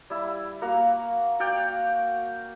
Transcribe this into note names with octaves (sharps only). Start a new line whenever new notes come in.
G3 E4
A#3 F#4 F5
F#4 D5 F5 G5